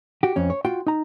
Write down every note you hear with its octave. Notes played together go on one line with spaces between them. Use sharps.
F#4 G4
F2 C#4
C#5
F4 F#4 G5 C6
D#4 A#5